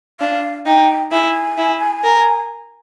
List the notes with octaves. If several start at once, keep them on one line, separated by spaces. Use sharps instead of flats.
D4 F5
D#4 G5
E4 G#5
E4
A#4